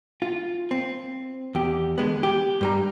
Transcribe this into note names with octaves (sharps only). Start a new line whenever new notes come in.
F4
C4
E2 G4
D3 G#3 B3
G4
G2 G3 A#5